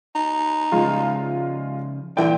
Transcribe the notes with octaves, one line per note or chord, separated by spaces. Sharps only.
D#4
C#3 F3 G#3 F4
A#2 D3 E3 E4 D5 G5